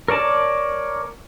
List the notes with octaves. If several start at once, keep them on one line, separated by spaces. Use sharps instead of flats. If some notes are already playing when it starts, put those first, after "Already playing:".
A#4 C#5 D5 A5